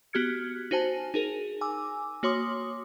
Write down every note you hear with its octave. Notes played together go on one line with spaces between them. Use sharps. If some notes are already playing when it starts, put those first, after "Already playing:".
B3 F#4 G4 F6 G#6 C#7
D#4 F#4 C5 G#5 A5
D#4 G#4 A#4
G#5 D6 E6
A#3 F#4 C#5 C6 D6 D#6